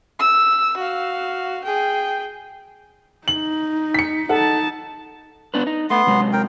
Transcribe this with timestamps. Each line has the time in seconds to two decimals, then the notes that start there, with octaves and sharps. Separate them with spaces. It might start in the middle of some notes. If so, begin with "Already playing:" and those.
0.19 E6
0.77 F#4 F5
1.64 G#4 G5
3.28 D#4 F#7
3.94 B6 C#7
4.29 D#4 A4 F#5 A5
5.54 B3 D4 B4
5.67 D#4
5.90 A3 B3 C6
6.07 C3 F#3 G#3
6.33 A#4 G5